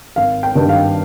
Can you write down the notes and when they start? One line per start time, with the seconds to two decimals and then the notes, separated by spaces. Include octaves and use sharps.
0.16 G#1 F5
0.43 G5
0.55 G2 D#3
0.69 F5